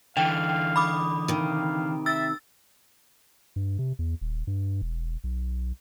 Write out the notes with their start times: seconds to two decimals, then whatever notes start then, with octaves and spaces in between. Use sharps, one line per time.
0.17 D3 E3 F5 G5
0.76 B5 D6 D#6
1.28 C3 D#3 F5
2.06 E5 E6 A6
3.56 G2
3.79 C3
3.99 E2
4.21 D#1
4.47 G2
4.82 E1
5.24 B1